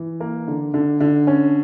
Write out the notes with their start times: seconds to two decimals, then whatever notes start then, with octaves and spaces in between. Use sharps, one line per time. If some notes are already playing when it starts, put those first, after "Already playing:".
Already playing: E3
0.20 A#3
0.48 D3
0.74 D3
1.01 D3
1.27 C#4